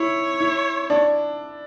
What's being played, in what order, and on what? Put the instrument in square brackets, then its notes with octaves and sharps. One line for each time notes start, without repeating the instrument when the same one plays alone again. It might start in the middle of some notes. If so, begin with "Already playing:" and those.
Already playing: [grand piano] E4 [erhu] C#5
[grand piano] E4
D4